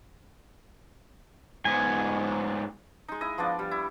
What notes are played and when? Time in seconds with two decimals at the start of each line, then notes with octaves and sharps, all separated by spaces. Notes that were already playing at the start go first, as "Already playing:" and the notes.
1.65 G#2 B3 G#5
3.08 G#3 D#4
3.21 E4 D#5
3.38 F3 B3 D4 D5
3.59 G3
3.71 E4